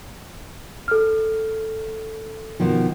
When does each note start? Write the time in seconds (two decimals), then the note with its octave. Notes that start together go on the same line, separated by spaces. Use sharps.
0.88 A4 F6
2.60 B2 D#3 F3